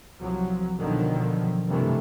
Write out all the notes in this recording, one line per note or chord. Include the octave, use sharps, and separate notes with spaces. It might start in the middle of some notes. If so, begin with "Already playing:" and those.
C2 F3 F#3
B2 D3 D#3 F3 F#3
G2 C3 D#3 E3 A3